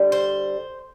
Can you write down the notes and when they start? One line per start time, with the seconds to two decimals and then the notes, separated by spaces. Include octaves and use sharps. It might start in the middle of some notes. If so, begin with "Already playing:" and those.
Already playing: D3 G3
0.12 C5